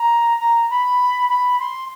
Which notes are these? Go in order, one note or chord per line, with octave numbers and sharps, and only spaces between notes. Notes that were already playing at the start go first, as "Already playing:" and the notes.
Already playing: A#5
A#5
B5
B5
C6